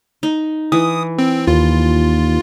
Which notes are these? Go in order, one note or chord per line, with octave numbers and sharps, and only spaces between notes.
D#4
E3 D#6
C4
D#2 F4